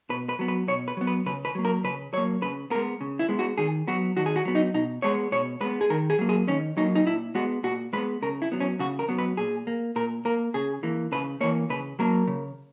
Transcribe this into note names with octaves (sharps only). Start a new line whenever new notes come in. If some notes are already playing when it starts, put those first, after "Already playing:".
B2 B4
B4
F#3 B3
B4
B2 C#5
B4
F#3 B3
B4
C#3 B4
B4
F#3 A#3
A#4
C#3 B4
F#3 A#3 C#5
C#3 B4
G#3 B3 A#4
C#3
E4
G#3 B3
F#4
D#3 G#4
F#3 B3 F#4
D#3 F#4
G#4
F#4
F#3 B3
D#4
B2 D#4
G#3 B3 C#5
B2 C#5
G#3 B3 B4
G#4
D#3 A#4
G#4
F#3 A#3
G#4
D#3 C#4
F#3 A#3 D#4
D#4
A#2 E4
G#3 B3 F#4
A#2 F#4
G#3 B3 B4
C#3 A#4
E4
F#3 B3
C#4
C#3 F#4
A#4
F#3 B3
B4
A#2 G#4
A#3
A#2 A#4
A#3 A#4
C#3 G#4
E3 A#3
C#3 B4
E3 A#3 C#5
C#3 B4
F#3 A#3 A#4
C#3